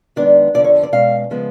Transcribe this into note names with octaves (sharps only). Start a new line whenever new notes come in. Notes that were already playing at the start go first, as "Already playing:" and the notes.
F#2 D#3 G#3 B3 D4 D5
F2 D3 F3 D5
C#5
D5
B2 G#3 C#4 F5
C#3 F3 G#3 B3